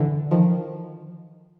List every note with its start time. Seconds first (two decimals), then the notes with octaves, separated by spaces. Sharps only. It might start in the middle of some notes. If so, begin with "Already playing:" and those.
Already playing: D3 E3
0.31 D#3 F3